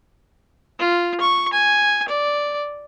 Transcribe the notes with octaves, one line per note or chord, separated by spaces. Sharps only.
F4
C#6
G#5
D5